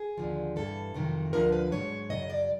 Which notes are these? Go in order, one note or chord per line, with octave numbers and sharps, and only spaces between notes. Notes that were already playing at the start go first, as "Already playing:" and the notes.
Already playing: G#4
D#2 D3 F3
G2 E3 A4
F2 C3 D#3 F#3
D2 D3 F3 A#4
B4
G#2 D#3 F#3 C#5
F#2 C#3 F#3 D#5
D5